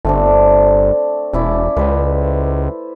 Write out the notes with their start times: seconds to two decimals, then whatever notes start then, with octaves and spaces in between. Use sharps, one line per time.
0.05 G1 A3 C4 D4
1.33 E1 C#4 E4 D5
1.77 C#2 B4 C5